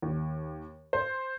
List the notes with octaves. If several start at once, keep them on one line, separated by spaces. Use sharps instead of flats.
D#2
C5